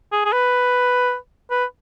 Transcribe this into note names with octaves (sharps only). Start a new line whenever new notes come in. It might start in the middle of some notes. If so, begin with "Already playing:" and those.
G#4
G#4
B4
B4